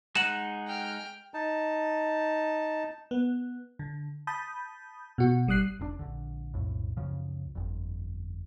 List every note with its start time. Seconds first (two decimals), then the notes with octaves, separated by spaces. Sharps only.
0.15 G#3 D#4 F#5 E7 F#7
0.67 G5 F6
1.34 D#4 A5
3.11 B3
3.79 D3
4.27 A5 B5 D#6 G6
5.18 B2 F#4
5.47 G#1 G3 D#6 F#6 C7
5.79 F1 A#2 D4
5.99 A#1 D3
6.54 B1 F2 A2
6.97 C#2 F#2 C#3 F3
7.55 G1 F2